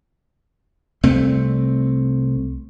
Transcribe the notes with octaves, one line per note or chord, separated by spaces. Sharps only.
C2 A3 C4